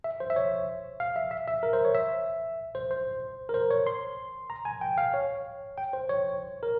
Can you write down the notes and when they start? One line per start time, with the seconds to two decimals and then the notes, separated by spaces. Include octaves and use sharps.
0.04 E5
0.20 C5
0.30 E5
0.36 C#5
1.00 F5
1.16 E5
1.31 E5
1.48 E5
1.63 A#4
1.73 C5
1.85 C#5
1.95 E5
2.75 C5
2.91 C5
3.49 A#4
3.54 C5
3.70 C#5
3.87 C6
4.50 A#5
4.65 G#5
4.81 G5
4.98 F5
5.14 C#5
5.78 G5
5.93 C5
6.09 C#5
6.63 A#4